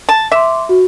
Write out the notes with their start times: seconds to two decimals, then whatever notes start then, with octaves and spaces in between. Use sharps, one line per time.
0.09 A5
0.32 E5 C6 D6
0.69 F#4